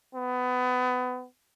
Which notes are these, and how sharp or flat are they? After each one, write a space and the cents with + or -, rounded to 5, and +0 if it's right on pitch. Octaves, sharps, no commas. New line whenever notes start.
B3 +25